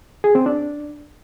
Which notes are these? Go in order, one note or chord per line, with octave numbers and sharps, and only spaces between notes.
G#4
C4
D4